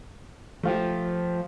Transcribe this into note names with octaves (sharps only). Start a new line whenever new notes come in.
F3 A3 F4 G4